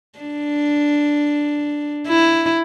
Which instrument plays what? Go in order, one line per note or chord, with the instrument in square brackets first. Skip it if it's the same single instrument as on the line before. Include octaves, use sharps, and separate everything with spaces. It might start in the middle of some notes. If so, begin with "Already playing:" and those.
[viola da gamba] D4
E4